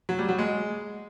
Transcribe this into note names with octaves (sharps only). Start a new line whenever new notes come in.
F#3
G3
F#3
G#3